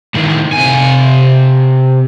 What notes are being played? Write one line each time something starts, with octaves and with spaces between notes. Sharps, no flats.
A2 D#3
C3 G#5